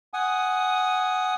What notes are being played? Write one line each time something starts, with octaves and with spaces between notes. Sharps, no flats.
F#5 G#5 D#6